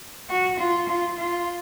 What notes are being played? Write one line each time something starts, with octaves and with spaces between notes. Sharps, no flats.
F#4
F4
F4
F4